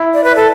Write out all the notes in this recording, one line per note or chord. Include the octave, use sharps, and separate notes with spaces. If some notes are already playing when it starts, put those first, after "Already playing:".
Already playing: E4
D5
B4
A4